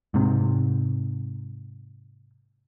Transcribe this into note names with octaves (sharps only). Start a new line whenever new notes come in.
G#2 C3